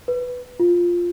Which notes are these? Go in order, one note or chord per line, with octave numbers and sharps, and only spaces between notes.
B4
F4